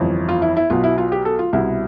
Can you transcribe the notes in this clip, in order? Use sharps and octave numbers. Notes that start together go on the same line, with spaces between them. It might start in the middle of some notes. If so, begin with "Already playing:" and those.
Already playing: G1 F2 E3
F4
E4
E4
B1 B2 F4
E4
F4
G4
A4
F4
C2 B2 E4